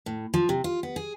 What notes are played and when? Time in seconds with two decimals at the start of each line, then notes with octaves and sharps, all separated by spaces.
0.06 A2
0.34 F3
0.49 C3
0.64 F4
0.83 B3
0.96 G#4